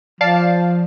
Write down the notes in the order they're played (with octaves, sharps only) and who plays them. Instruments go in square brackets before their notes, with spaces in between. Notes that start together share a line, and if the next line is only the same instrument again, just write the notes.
[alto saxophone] F3 [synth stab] D5 F5 A5